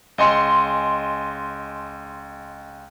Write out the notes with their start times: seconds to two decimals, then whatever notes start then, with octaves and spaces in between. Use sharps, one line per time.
0.18 C#2 D#5 G#5 C6 C#7